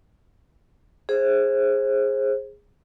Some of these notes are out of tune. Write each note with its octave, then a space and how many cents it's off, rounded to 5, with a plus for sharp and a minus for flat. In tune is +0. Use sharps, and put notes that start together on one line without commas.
G#4 -5 C5 +30